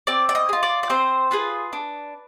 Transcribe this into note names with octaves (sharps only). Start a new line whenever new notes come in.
C4 D5
D5
D#5
G#4
F4
D5
D5
C4 C5
F4 G#4 B4
D4